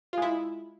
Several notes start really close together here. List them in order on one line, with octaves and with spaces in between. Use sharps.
F4 G#3 E4